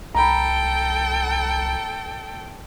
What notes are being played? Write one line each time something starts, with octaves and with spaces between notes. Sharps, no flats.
C2 A4 G5 A#5 B5